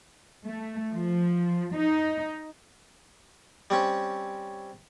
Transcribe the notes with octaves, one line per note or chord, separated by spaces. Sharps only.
A3
F3
D#4
G3 C4 C#4